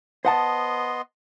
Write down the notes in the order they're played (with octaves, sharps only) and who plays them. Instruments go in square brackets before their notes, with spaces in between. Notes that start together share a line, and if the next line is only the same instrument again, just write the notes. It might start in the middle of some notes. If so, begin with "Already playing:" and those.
[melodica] B3 D#5 C6 [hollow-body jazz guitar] C5 F#5 A5